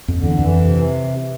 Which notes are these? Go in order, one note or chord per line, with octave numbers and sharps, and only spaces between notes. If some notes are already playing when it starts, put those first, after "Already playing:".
F2
D3
E2
F2 E3
C3